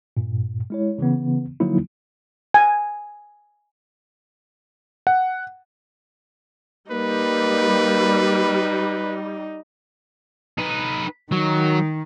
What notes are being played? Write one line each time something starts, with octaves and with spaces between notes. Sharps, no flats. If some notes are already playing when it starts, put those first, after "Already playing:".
G2 A#2
G#3 E4 C#5
C#3 E3 B3
D3 F3 F#3 A#3 D#4 E4
G#5
F#5
G3 A#3 D#4 B4
D#4 B4
D#3 F#3